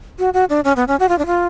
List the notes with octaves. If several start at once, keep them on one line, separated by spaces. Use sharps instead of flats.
F#4
F#4
D4
C#4
B3
C#4
F#4
F4
D4
F4